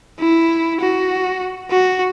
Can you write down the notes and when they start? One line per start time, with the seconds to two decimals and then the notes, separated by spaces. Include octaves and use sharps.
0.19 E4
0.80 F#4
1.71 F#4